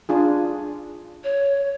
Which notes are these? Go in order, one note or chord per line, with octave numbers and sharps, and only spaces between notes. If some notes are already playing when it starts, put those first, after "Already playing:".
D4 F4 G#4
C#5